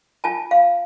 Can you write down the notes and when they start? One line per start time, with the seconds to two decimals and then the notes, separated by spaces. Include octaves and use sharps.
0.24 F4 G#5 A5
0.51 F5